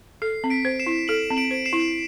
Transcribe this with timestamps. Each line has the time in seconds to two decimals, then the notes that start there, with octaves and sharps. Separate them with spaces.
0.22 A4 C7
0.44 C4
0.50 B6 D7
0.65 C5
0.79 C7 E7
0.87 E4
1.08 A4 D7 F#7
1.30 C4
1.37 D7 F#7
1.51 C5
1.66 C7 E7
1.73 E4